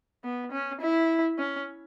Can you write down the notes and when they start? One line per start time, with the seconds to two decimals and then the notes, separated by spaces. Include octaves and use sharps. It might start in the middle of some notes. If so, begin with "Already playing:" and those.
0.24 B3
0.52 C#4
0.81 E4
1.39 C#4